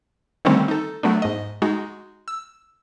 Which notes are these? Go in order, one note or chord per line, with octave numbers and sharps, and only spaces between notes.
D3 D#3 G3 A3 C4 C#4
D#4 A4
F#3 A3 B3 D4
G#2 D#5
G#3 D#4 F#4
E6